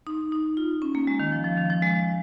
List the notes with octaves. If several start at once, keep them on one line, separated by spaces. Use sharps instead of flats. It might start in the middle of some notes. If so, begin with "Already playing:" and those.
D#4
D#4
F4
C#4
A#3
G#3
D#3
F3
F3
D#3
F3
G#3